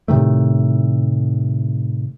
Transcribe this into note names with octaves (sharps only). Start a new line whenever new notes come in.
A2 C3 D#3 A3